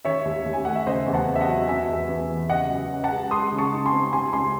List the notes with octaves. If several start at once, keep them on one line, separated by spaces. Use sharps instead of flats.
D#3 C#5 E5
D#2
D#2
G#5
A3 F#5
E5
C#3 C5 D#5
E2
F#5 A5
C4
E5
D#5 F#5
F#3
C3 E5 G#5
E2
E2
E3
C#3 D#5 F#5
F#2
C#4
F#5 A5
G#3
G#3 C6 D#6
C#3
A5 C#6
D#4
G#5 C6
C4
C3 G#5 C6
C#2 G#5 C6